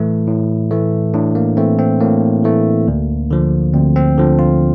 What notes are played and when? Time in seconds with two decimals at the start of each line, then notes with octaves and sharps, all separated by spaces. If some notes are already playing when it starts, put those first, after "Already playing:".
Already playing: A2 E3 A3 E4
0.27 A2
0.71 E3 A3
1.14 A2 D4
1.35 A#3
1.57 E3 A3 C4
1.79 C4
2.01 A2 A#3
2.44 E3 A3
2.88 D2
3.31 D3 F3
3.74 D2 C4
3.96 C4
4.18 D3 F3
4.39 F4